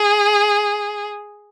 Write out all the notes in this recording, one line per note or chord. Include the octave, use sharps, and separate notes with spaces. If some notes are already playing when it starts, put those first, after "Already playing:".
Already playing: G#4